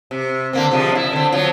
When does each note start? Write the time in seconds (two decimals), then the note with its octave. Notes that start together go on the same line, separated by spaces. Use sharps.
0.11 C3
0.53 D3 A#3 C4
0.71 C3 F3 G#3
0.92 D4 E4
1.13 D3 C4
1.32 F3 F#3